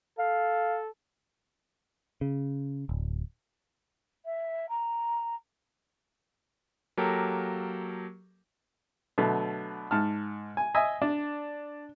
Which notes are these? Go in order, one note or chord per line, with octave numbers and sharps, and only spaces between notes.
A4 F5
C#3
D1
E5
A#5
F#3 A#3 G4 A4 A#4
B2 D3 F#3 A3
G#2 A5 F6
G#5
D#5 E5 G#5
D4